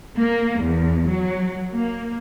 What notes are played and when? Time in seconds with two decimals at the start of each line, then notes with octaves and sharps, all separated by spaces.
0.17 A#3
0.62 E2
1.09 F#3
1.72 A#3